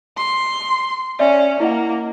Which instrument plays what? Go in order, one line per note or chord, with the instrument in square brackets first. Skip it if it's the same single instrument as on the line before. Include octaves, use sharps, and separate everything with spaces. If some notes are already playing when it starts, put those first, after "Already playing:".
[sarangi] C6
[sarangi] C#4 [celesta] D5 E5
[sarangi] A#3 [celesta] E4 D#5 F#5